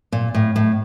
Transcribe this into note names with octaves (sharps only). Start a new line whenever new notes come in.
A#2
A2
A2